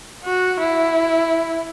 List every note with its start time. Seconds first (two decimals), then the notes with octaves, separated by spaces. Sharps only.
0.25 F#4
0.60 E4